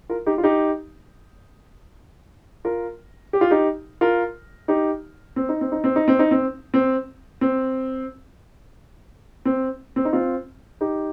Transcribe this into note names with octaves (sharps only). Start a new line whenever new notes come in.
F4 A#4
D#4 G4
F4
D#4 G4
F4 A#4
G4
F4
D#4 G4
F4 A#4
D#4 G4
C4
D#4
C4
D#4
C4
D#4
C4
D#4
C4
C4
C4
C4
C4
D#4
C4 F4
D#4 G4